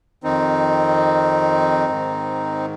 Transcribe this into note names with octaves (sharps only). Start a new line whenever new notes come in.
F2 D#3 C4 D#4
G#2 D#3